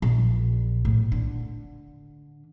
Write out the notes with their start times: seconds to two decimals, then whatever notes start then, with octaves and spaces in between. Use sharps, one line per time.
0.02 A#1
0.85 A2
1.12 D3